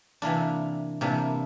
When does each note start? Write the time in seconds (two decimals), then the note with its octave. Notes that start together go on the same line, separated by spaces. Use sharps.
0.22 C3 E3 A#3 D4
1.01 C3 E3 A#3 D4